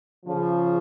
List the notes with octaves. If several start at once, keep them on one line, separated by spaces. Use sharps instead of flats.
C#3 F3